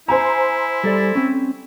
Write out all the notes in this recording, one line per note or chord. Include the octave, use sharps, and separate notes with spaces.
E4 C5 G#5 A#5
G3 A4 D5
C4 C#4